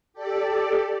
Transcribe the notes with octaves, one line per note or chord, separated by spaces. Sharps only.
G4 A4 D5